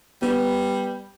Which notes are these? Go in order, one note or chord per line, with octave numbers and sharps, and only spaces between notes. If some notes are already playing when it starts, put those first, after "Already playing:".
G3 B3